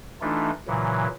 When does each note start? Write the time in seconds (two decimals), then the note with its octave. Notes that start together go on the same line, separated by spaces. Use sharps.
0.21 E3 A3 D4 D#4 F4
0.67 A#2 C#3 E3 F#3